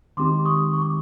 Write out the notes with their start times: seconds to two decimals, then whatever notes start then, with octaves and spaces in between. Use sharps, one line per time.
0.17 D#3 G#3 C4 D#4 G4 C6 D6
0.45 C#6 D#6
0.73 C#6
0.82 D6